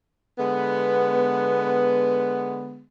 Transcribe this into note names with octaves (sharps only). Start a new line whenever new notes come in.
D3 G#3 B3